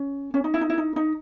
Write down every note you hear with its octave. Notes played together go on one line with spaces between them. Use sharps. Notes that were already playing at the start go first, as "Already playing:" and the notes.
Already playing: C#4
C#4
D#4
E4
D#4
E4
D#4
D#4